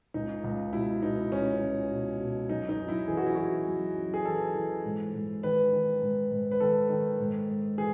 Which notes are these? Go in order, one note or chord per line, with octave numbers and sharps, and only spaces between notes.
C#2 D#4
C#2
B2 E4
B2 D#4
C#2 C#4
C#2
B2
B2
F#2 D#4
D#4
F#2
E4
E3 G#4
F#4
E4
E3 F#4
F#2
F#2
G#4
E3 A4
E3
G#2
G#2
D#3 B4
D#3
G#2
G#2
B4
D#3 A4
D#3
G#2
G#2
E3 G#4